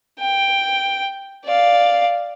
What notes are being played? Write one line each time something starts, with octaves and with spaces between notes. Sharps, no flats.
G5
D5 F5